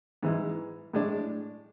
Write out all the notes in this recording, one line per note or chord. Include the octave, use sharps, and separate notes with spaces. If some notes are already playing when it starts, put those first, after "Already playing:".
G#2 E3 G#3
A2 G#3 D4